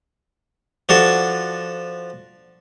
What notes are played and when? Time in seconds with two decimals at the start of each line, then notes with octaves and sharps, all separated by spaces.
0.89 F3 D4 F#4 A4